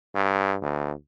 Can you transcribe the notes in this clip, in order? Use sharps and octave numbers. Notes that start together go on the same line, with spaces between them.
G2
D2